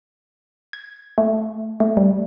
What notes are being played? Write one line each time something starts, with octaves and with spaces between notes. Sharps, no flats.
G#6
A3
A3
G3